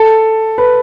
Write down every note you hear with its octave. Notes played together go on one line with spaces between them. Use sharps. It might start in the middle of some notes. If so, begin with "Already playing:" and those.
Already playing: A4
B4